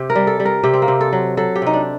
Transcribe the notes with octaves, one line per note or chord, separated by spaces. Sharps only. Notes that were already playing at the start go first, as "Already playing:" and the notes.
Already playing: C3 G4
A#4
G3
A4
G3
A#4
C3 G4
C4
A#3
C3
A4
F#3
F#3 A4
G4
C3 D#4
D4